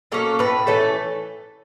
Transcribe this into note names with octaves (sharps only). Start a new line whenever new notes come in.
F#3 A#3 C#4 A4
A2 B4
E3 A3 C#4 A4